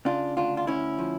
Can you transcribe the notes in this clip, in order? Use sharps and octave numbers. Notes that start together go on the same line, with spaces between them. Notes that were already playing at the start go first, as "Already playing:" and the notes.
C#3 D4 F4
D2 D4 F4
F4
D2 C#4 E4
F3